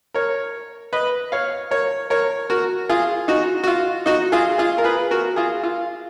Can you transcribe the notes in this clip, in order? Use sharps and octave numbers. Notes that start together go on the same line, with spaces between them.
A#4 C#5
B4 D#5
C#5 F5
A#4 C#5
A#4 C#5
F#4 A#4
F4 G#4
D#4 F#4
F#4
F4
D#4 F#4
F4 G#4
F4 G#4
A#4
G#4 B4
F#4 A#4
F4 G#4
F4